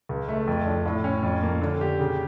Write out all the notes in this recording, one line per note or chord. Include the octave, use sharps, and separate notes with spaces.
C#2
A3
F2
D4
A2
C#4
F2
A#3
D3
G4
C#3